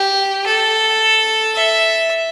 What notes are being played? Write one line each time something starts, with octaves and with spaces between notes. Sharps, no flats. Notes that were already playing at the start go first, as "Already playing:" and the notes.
Already playing: G4
A4
E5